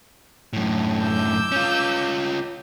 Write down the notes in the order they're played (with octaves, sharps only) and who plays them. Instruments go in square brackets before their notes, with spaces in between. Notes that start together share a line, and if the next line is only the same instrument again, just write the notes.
[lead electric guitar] F#2 A2
[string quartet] D6 E6 G6
[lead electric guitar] C#4 F4